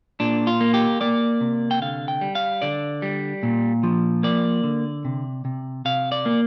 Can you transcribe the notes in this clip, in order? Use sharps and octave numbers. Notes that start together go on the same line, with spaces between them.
A#2 D4
F4
A#3
G4
A#3 D5
C3
G5
D3 F5
G5
G3
F5
D3 D5
G3
A#2
F3
A#3 D5
D3
C3
C3
C3 F5
D5
A#3